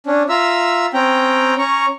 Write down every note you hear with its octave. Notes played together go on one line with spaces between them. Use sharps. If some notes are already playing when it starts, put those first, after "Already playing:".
C#4 D4
F4 E5 A#5 E6
C4 C#4 G5 A#5
C#4 A#5 C#6